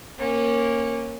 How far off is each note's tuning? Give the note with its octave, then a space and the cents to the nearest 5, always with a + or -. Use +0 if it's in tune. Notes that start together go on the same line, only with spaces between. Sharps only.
A#3 +0 C#4 -20